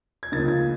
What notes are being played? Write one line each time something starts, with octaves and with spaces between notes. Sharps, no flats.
G#6
C#2 C#3 F3 A#3 D#4 A6
G#6